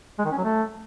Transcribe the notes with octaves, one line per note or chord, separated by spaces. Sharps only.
G#3
D#3
C#4
F#3
A3